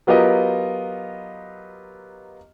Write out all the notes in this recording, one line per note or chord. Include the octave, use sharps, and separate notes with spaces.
F#3 B3 F4 G4 A#4 D#5